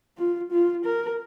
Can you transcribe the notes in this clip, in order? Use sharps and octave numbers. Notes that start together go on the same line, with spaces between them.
F4
F4
A#4